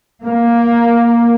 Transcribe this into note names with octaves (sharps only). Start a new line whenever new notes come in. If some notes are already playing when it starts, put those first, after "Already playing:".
A#3